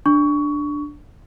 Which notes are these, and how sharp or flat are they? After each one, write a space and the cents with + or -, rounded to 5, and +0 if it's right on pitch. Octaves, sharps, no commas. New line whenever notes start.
D4 +5 C#6 +20